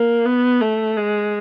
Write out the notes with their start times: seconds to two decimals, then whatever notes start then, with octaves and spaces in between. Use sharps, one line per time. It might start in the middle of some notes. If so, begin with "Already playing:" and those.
Already playing: A#3
0.25 B3
0.61 A3
0.97 G#3